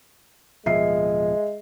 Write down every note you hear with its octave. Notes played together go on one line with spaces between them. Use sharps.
D1 B2 F3 G#3 E5 C7